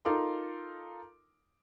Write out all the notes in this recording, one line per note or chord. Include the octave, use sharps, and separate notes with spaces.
D#4 F4 A4 A#4 C6 D6